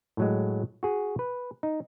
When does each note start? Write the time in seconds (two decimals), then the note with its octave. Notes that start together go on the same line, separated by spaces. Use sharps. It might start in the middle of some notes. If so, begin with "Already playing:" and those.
0.17 A2 F#3 G#3
0.83 F#4 G#4
1.19 B4
1.63 D#4